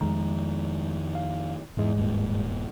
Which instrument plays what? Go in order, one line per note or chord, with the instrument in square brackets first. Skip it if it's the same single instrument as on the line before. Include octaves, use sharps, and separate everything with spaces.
[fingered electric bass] F2 D#3 [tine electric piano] G#3 A#5
[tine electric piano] F5
[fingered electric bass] E2 [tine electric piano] G#2 G#3
[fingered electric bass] D#1 G2 A#2